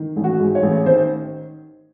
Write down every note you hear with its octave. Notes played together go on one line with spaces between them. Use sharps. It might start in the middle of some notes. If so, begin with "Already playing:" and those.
Already playing: D#3
A1
F#4
G#2
C#5
A1
D#3 C5